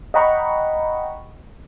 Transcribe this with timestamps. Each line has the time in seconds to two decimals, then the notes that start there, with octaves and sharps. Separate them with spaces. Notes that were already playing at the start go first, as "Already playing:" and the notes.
0.14 D#5 F#5 G5 A#5 B5 C#6